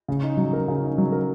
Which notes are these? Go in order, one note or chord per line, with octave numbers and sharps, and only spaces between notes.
C#3
D#4
F#3
A#4
C#3
D#4
F#3
A#4